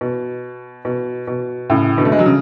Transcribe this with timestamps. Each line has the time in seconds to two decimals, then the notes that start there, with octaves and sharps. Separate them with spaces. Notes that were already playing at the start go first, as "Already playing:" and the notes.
0.01 B2
0.85 B2
1.27 B2
1.70 A2 C#3
1.98 B2 D3
2.05 A3
2.12 G#3
2.19 F#3
2.26 C#3